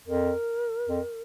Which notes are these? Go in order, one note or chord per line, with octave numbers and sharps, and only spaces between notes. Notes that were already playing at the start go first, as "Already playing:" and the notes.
F2 A#4
F2